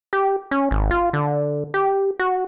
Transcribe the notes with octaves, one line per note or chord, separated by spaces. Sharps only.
G4
C#4
G#1
F4
D3
G4
F#4